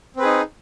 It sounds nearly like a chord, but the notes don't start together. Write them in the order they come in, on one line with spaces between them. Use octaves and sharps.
C4 B4 G#4 D#4